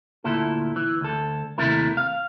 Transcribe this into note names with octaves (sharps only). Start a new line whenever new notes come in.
D2 A#2 E4 A4
E3
D2 A4
D#2 C3 A3 E4 A#4
F5